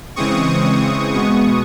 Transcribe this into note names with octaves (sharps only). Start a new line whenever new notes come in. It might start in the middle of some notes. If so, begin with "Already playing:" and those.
C#3 E3 G#3 C4 C#6 D#6
B2 G#3 B3 C#6 D#6